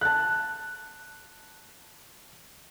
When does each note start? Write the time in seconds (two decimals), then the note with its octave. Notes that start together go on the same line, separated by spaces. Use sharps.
0.01 A5 F#6